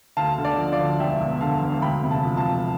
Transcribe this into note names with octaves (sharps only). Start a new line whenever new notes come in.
D2 F5 A5
D3
D5 F5
F3
D5 F5
D2
E1 E5 G5
E2
D3 F5 A5
E1
D2 G5 B5
C3
F5 A5
F3
F5 A5
D2